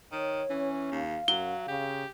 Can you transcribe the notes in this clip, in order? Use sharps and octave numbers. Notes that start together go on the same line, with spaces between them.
D#3 C#5
E3 C#4
D#2 F5
F#2 F#3 G7
C#3 G4